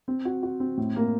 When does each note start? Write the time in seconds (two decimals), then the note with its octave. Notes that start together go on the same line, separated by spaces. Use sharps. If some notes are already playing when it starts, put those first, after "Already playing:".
0.08 C4
0.25 F#4
0.43 F#4
0.60 C4
0.77 A2
0.96 A#3